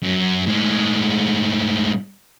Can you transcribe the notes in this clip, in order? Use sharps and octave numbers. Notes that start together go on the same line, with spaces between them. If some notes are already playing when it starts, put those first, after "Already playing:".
F#2
A2 G#3